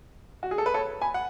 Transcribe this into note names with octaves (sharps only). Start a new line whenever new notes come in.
F#4
G#4
A4
B4
A4 C#5
G#5 B5
F#5